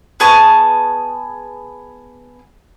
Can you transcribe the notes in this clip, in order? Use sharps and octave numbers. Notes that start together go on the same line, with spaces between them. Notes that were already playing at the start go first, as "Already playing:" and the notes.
B3 G#4 A5 C#6